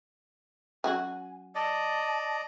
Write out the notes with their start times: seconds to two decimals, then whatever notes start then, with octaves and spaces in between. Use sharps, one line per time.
0.84 F#3 C#4 F#4 G#5
1.55 D5 D#5 A5